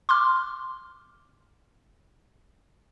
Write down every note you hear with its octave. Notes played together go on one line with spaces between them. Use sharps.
C6 D6 F6